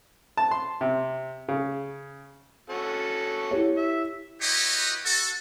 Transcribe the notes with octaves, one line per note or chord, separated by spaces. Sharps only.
A5
C6
C3
C#3
C#4 F#4 A4
E4 G4 C#5
E5
E4 F#4 G4 B4 C#5 D#5
F#4 A4